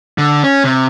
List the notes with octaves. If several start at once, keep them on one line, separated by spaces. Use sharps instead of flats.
D3
C#4
C3